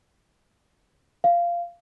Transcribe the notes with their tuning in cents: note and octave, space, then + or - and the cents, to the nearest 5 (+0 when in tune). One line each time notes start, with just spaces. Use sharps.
F5 -15